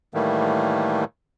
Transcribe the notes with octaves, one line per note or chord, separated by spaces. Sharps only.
A2 D#3 E3 G3 A3 A#3